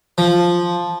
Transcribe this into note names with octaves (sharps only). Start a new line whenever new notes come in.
F3